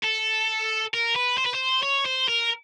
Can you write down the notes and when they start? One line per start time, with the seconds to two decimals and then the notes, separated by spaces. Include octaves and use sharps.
0.04 A4
0.94 A#4
1.16 B4
1.38 C5
1.46 B4
1.55 C5
1.83 C#5
2.06 C5
2.28 A#4